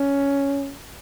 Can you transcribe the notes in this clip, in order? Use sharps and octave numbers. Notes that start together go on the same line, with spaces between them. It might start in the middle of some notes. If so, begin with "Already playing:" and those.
Already playing: C#4